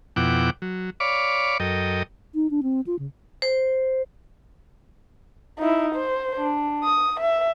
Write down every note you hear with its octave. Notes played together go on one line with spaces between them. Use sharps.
F2 B2 E4 F#5 G5 D6
F#3
C#5 D5 F5 B5 D6
F#2 A4 A#4 D#5 G5
D#4
D4
C4
F4
C#3
C5
D#4 E4
C5
D4
D#6
E5